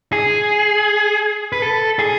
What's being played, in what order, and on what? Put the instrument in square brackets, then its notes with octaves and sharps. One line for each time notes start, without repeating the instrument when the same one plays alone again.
[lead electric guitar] G#4
B4
A4
G#4